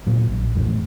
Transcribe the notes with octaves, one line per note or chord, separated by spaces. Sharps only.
A#2 F#3
A#1
A1 F2 A2 A3